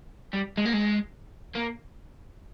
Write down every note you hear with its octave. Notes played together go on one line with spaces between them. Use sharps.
G3
G#3
A#3
G#3
A#3